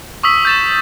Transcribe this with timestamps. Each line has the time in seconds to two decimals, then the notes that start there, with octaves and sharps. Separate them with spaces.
0.23 C#6 D#6 E6 B6
0.45 G6 A6 E7